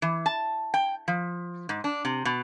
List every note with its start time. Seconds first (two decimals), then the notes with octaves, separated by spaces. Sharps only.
0.02 E3
0.26 A5
0.74 G5
1.08 F3
1.69 G#2
1.84 D4
2.05 C3
2.25 B2